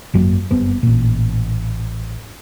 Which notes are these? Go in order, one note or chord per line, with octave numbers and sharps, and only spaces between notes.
G#1 F#2 F#3 A#3
F#1 G2 B3 C4
A1 A#2